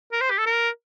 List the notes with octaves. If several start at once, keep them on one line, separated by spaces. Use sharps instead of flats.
A#4
C5
G4
A4
A#4